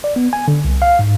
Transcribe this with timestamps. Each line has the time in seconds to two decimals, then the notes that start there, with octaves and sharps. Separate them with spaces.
0.04 D5
0.16 B3
0.33 G#5
0.48 D3
0.64 C2
0.82 F5
0.99 G#2